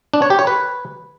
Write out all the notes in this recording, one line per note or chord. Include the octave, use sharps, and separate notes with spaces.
D4
C#5
G4
C#5
B4